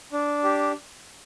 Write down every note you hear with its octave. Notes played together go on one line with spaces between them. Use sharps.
D4
G4